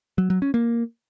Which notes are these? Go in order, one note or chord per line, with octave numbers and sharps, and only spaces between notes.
F#3
F#3
C#4
A#3